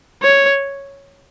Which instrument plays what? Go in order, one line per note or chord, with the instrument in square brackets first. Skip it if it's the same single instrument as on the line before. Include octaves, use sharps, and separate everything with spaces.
[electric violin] C#5